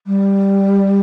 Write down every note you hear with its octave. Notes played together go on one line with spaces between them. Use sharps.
G3